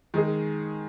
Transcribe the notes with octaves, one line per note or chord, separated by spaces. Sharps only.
D#3 G#3 D#4 G#4